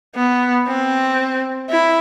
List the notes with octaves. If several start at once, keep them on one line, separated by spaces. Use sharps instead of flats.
B3
C4
E4